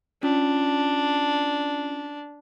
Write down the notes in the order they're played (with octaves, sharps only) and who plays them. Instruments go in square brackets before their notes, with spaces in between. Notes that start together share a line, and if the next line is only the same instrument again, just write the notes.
[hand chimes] C#4 F4 [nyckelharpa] D4